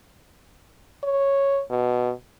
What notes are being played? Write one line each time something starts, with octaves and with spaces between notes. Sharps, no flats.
C#5
B2